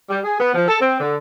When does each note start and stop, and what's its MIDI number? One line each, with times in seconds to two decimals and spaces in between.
0.10 0.19 55
0.25 0.39 68
0.40 0.50 59
0.54 0.67 53
0.68 0.79 69
0.81 0.98 60
1.00 1.17 50